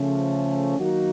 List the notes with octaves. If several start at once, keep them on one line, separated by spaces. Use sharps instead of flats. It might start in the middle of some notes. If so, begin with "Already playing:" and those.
Already playing: C#3 F3 A3 C#4
D#3 F#3 A#3 D#4 F#4